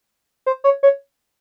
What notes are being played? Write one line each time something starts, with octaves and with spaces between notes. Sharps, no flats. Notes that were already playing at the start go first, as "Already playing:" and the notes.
C5
C#5
C#5